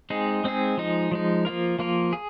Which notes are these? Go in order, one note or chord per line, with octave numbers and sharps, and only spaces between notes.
G#3 C4 D#4 G#4
G#3 C4 D#4 G#4
F3 G#3 D#4
F3 G#3 D#4
F3 A#3 F4 A#4
F3 A#3 F4 A#4
G#4